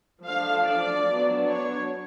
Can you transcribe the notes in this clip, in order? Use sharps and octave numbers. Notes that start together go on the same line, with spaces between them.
F3 A3 D4 F5
D5
F#3 B3 D4
C#5